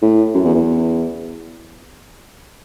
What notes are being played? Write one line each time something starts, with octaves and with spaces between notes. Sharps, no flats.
A2
F#2
E2
E2